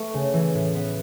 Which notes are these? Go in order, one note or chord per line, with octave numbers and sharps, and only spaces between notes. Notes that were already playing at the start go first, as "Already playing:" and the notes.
Already playing: A3 B3 C#6
C#3
E3
A2
B3